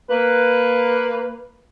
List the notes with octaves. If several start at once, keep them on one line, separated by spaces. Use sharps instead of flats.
A#3 B4